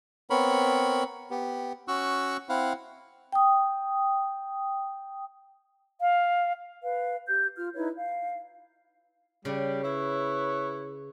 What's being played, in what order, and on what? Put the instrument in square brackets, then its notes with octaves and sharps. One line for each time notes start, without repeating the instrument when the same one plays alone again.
[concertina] B3 C4 A#4 C#5 B5
B3 G4
C#4 F#4 C#6 E6 F#6
C4 E4 F5 F#5
[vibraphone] G5 D#6
[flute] F5
[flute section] B4 F5
G4 G6
F4 F6
D#4 E4 B4 C#5
F5
[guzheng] C#3 [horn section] G3
[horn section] E4 B4 C#5